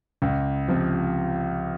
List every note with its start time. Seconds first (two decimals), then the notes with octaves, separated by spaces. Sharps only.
0.22 C#2
0.68 C3 F3